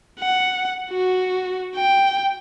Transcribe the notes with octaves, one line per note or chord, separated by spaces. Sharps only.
F#5
F#4
G5